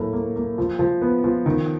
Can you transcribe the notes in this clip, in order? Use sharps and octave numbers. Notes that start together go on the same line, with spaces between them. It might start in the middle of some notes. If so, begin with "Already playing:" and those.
Already playing: A2 F#3 A#3
A#3
A#3
F3
F3
B3
F3
D#3